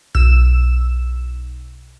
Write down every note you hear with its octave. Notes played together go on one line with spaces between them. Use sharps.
B1 E6 E7